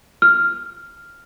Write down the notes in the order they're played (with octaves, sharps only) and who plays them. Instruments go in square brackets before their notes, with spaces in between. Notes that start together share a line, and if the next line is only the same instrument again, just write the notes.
[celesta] F6